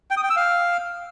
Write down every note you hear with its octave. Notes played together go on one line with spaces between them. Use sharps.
G5
D#6
G5
E6
F5